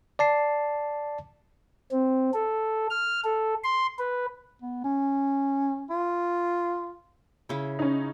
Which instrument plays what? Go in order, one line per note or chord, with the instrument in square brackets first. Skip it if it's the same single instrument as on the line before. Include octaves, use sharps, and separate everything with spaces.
[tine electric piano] D5 A5 C7
[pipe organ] C4
A4
F6
A4
C6
B4
[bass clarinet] B3
C#4
F4
[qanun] C#3 E4
[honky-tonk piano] C#4 D#4